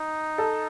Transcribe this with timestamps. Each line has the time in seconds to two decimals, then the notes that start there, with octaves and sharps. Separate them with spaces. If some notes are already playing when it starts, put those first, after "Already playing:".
Already playing: D#4
0.38 A4